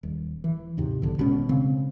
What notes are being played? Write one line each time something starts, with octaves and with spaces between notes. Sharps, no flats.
D#1
E3
D#2 G#2 C3
B1 D3
G#1 B2 G#3 C#4
C#3 C4